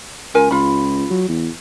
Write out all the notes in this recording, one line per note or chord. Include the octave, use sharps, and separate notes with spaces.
C#2 F4 A#4 G#5
C#2 F4 B5
F#3
E2